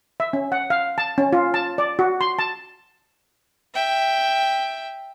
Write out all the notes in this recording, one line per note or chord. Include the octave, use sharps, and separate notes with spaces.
E5
C#4
F#5
F5
A5
C#4
F4
A5
D5
F#4
C6
A5
E5 G5